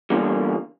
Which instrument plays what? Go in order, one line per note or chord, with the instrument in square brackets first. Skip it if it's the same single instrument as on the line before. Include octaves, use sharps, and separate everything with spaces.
[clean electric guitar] E2 D3 G3 A#3